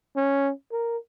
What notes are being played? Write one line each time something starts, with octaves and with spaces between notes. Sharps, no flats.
C#4
A#4